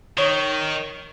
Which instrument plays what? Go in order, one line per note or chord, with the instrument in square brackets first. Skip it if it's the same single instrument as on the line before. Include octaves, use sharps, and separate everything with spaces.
[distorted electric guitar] D#3 [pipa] C#5